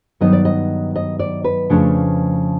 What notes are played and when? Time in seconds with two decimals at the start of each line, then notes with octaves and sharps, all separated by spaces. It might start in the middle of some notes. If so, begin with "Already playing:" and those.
0.21 G2 D#3 F#3 B3 D#4 D#5
0.33 D5
0.45 D#5
0.96 D#5
1.19 D5
1.44 B4
1.70 F2 C#3 F3 A3 D4